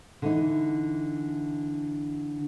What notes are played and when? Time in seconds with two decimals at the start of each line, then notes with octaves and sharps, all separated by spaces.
0.22 D3 E3 D#4